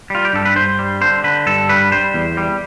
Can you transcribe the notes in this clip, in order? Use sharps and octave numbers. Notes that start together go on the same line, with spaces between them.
G3 F4
G4
G2 A4
B4
G2 C5
G3
D3 C5
D3 B4
G2 A4
G3 B4
G3 C5
E2
G3